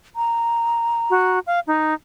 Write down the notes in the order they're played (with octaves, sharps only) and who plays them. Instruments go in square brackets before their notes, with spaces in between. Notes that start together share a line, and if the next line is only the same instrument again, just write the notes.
[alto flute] A#5
[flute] F#4
F5
D#4